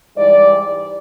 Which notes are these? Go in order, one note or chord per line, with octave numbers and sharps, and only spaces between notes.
G#2 E3 G3 D5